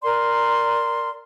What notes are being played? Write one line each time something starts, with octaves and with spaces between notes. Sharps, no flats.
A#4 D5 C6